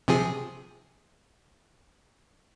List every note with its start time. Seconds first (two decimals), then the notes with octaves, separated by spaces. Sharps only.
0.08 C3 F3 G#4